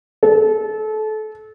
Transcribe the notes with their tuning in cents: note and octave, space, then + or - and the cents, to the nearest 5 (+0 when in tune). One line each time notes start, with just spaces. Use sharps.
A4 -30